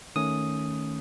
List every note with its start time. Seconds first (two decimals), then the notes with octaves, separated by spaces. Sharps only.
0.16 D#3 A3 C#4 D#6